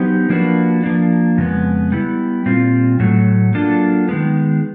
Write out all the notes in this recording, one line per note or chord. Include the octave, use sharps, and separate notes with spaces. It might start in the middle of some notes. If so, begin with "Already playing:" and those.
Already playing: F#3 B3 D#4 G4 C5
F3 A#3 D4 F#4 B4
F3 A#3 D4
F2 C#3 G#3 B3
G3 B3 E4
A#2 G3 C4 F4
A2 F#3 A3
F#3 A#3 D4 F4 A4
D#3 G#3 B3